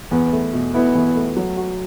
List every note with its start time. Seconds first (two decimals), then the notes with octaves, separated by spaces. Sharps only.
0.11 E2 B3
0.33 A3
0.53 B2
0.74 B3 E4
0.95 E2
1.15 A3
1.36 F#3
1.57 F#4